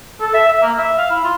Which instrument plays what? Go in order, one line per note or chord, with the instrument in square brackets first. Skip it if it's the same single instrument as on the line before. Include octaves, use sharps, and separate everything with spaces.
[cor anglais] A4
E5
E5
A#3
E5
F5
E4
F4